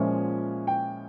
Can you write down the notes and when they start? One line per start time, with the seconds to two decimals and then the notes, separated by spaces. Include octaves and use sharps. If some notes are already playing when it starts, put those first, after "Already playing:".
Already playing: A#2 F3 G#3 C#4 E4
0.67 G5